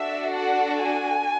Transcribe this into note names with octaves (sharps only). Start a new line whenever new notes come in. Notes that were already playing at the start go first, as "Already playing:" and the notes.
Already playing: D4 F#4 A4 E5
F#5
G#5